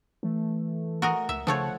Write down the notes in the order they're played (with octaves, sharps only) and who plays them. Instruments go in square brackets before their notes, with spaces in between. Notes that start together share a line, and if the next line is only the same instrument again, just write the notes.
[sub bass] E3 [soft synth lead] A3
[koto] F#4 A#4 D#5
[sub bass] C#2 [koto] E5
[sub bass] C#3 [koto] F3 A3 C#5 [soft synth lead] F#5